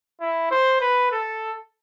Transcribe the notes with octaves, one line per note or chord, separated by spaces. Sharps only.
E4
C5
B4
A4